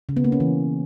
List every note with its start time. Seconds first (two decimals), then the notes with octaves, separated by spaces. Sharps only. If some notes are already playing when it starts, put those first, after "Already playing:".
0.09 C#3
0.17 B3
0.24 A#3
0.32 C#4
0.40 E3